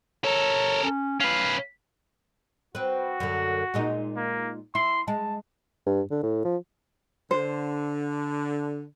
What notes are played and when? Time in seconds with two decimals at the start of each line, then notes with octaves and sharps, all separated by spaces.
0.24 A4 A#4 C#5
0.83 C#4
1.20 C#4 B4 F5
2.75 C4 F#4 B4
3.20 F#2 D3
3.74 A#2 G#3 D#4
4.17 A#3
4.75 E4 C6
5.08 G#3 A5
5.86 G2
6.11 D3
6.23 A2
6.44 F3
7.31 D3 C5